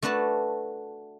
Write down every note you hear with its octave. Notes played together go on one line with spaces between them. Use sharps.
A3 D4 F#4 B4 A5